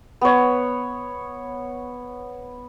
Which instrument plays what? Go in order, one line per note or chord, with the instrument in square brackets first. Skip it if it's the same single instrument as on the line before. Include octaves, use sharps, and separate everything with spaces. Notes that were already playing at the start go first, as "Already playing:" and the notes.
[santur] B3 C#5